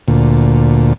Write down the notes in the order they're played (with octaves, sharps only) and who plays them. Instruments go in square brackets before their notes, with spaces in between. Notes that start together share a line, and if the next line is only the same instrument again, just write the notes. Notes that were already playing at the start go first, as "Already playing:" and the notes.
[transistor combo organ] D2 A#2